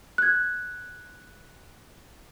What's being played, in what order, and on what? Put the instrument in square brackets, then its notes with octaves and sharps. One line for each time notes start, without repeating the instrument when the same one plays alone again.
[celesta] F#6 G#6